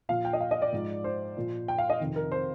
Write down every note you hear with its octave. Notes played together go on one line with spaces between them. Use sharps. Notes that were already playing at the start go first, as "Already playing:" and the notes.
A#2 F3 F5
G5
D#5
F5
D#5
D5
G#2 F3
C5
A#2 F3
G5
F5
D#5
F2 C3 D#3
A#4
C5